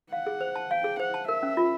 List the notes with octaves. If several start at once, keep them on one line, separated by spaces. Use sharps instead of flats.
F5 F#5
G#4
C5
A5
F5 G5
G#4
C5 F#5
A5
A#4 E5
C#4
F4